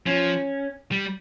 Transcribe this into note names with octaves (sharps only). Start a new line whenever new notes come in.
F3 C#4
G3